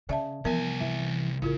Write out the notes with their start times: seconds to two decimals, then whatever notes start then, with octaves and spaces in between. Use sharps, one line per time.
0.09 C#3 D5 E5 A5
0.45 C2 E3 F3 B3 A#4 G#5
0.80 E3 E5
1.42 A1 C#3 E4 F4 A#4